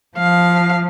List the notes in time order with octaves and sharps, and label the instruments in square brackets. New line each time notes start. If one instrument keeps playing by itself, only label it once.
[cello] F3 [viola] F5